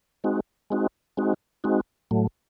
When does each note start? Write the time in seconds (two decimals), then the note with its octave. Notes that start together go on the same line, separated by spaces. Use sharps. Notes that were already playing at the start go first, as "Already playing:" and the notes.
0.24 G#3 C4 D#4 F#4
0.70 G#3 C4 D#4 F#4
1.17 G#3 C4 D#4 F#4
1.64 G#3 C4 D#4 F#4
2.11 A2 F#3 A3